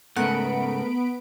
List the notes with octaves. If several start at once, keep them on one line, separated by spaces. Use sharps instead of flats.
G#2 C#3 A3 B3 A#4 F#5 B5 D7